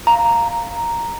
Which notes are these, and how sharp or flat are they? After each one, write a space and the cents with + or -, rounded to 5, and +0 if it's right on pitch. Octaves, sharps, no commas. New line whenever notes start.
F5 +0 A#5 -5